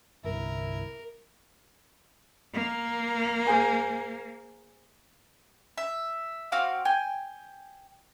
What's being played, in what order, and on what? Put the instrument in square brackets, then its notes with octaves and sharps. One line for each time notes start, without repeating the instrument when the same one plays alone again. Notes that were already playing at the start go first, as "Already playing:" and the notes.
[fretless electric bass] G1 C2 [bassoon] E4 [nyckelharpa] A#4
[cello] A#3
[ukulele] G#4 C5 G#5
[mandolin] E5
C4 F#4 F5 D6
G5 G#5